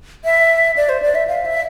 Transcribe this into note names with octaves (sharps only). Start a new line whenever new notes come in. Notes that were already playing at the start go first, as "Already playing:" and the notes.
E5
D5
C5
D5
E5
F5
E5